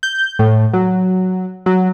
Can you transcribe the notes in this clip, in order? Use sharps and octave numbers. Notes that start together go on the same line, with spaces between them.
G6
A2
F#3
F#3